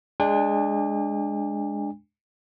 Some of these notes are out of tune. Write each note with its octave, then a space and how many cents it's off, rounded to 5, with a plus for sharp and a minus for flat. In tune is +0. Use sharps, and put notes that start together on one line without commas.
G#3 +0 D4 +0 G#5 -45